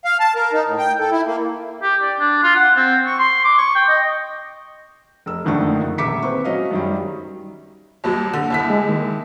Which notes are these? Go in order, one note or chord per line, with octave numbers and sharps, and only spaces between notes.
F5
A5
A#4
D#4
A2
G5
A4
E4
A#3
G4
D5
D4
F4
F#5
C4
C#6
C6
D6
C#6
G5
D#5
F1 E6
F#1 F2 D3 D#3 A3 C#6
D#1 E5 D6 B6 C#7
C4 B4 C#6
F#3 C#4 D#5 F5
F#2 D#3 G3
D#2 F#3 G3
D3
D#2 E4 B6
G#3
D#3